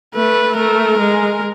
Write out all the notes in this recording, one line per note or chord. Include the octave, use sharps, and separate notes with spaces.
A3 B4
A3 A#4
G#3